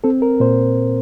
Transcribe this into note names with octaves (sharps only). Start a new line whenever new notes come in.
C4 A4
A#4
A#2 C5